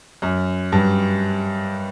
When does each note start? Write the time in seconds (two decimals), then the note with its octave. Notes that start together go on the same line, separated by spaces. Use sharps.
0.22 F#2
0.72 G2